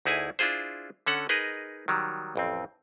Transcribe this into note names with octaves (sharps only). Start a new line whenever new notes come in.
D2 D#4 E4 G#4 B4 G#5
D4 E4 F4 G#4 C5
D3 C#4 A4 F#5
D#4 G#4 A#4 B4 D#5
D#3 F#3 G3
A1 F2 C4